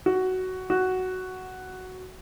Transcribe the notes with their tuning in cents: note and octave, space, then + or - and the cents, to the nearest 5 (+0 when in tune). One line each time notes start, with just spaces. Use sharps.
F#4 +10
F#4 +5